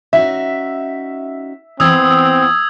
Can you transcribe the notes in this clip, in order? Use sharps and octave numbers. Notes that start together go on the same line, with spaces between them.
C#4 D#4 F#4 E5
E3 B3 C4 D#6 E6 G#6